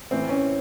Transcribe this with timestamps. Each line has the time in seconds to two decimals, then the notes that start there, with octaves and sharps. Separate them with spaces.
0.11 A2 E3 C4
0.29 C#4